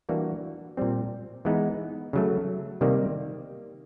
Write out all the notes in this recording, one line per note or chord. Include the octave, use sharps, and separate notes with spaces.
E3 G3 A#3 D4 F#4
A#2 G3 C4
E3 G#3 B3 D#4
C#3 F#3 A3
C3 D#3 G3 A#3